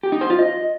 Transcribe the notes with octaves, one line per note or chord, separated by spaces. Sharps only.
G4
D#4
C5
F4
D#5